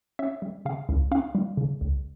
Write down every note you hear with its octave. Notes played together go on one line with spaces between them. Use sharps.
C#4 E5
G3
C#3 F5
C#2
C#4 F5
G3
C#3
C#2